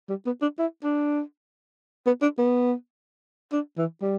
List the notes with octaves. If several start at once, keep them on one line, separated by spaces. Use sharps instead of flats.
G3
B3
D4
E4
D4
B3
D4
B3
D4
E3
G3